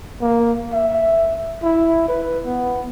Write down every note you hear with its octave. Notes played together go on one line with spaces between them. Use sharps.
A#3
E5
E4
B4
B3